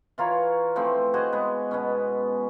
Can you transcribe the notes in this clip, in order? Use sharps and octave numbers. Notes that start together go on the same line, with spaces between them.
E3 F4 A#4 C#5
E3 F3 A3 C4
F#4 G#4 C5 D#5
G#3 B3
B2 B3 C#4